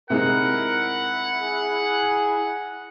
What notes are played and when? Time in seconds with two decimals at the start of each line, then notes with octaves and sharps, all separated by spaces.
0.10 C3 G#3 D#4 E4 A#4 F#5
1.40 G#4